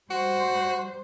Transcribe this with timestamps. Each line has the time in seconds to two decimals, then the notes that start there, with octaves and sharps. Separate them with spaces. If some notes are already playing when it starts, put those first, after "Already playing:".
0.11 G3 F#4 C5